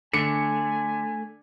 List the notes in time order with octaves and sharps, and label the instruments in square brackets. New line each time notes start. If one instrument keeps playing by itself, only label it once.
[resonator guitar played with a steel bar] D3 [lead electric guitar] A3 [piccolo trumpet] G#5 [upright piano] C#7